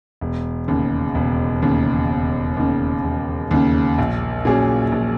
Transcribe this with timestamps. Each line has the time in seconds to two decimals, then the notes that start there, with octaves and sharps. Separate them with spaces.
0.21 E1
0.68 D#2 C#3
1.15 E1
1.62 D#2 C#3
2.10 E1
2.57 D#2 C#3
3.04 E1
3.51 D#2 C#3
3.98 A#1
4.45 A#2 F#3 C#4 G#4
4.92 A#1